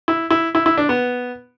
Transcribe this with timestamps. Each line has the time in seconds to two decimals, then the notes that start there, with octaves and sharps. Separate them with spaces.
0.08 E4
0.31 E4
0.55 E4
0.66 E4
0.77 D4
0.89 B3